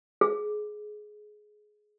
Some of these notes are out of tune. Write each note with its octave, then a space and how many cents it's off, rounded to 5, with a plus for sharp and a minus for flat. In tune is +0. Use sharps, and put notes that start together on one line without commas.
G#4 +20